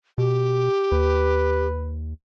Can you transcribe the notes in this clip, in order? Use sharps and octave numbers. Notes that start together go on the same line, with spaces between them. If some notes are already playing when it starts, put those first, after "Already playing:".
B2 G4
D#2 B4